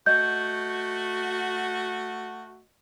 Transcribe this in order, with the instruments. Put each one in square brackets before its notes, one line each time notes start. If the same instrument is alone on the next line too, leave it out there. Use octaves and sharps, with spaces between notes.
[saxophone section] A3 F#4 [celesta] D#5 G6